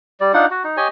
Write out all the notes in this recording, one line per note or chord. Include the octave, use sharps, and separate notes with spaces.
G3 D5
D4 D#4 F4 F#5
F#4
D#4
G4 C#5 D#5 G#5